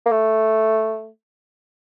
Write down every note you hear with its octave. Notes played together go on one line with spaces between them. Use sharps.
A#3
A3